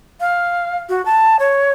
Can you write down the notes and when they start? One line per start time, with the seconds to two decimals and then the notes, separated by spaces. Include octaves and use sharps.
0.20 F5
0.89 F#4
1.06 A5
1.39 C#5